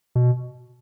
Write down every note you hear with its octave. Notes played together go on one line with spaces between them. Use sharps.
B2